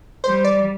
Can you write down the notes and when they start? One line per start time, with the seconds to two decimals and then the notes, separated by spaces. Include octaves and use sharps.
0.24 G3 C5
0.45 D5